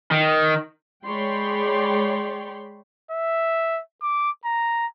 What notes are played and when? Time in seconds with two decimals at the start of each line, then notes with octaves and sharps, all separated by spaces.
0.12 D#3
1.05 G#3 C#5 D5 G5 B5 C6
3.11 E5
4.02 D6
4.45 A#5